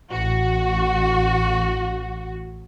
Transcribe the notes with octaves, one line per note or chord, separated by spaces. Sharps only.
A1 F#4